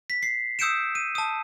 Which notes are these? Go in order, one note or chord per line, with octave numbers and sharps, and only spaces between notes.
B6
C7
D#6 E6 G6 C#7 D7 E7
D#7
A5 D#6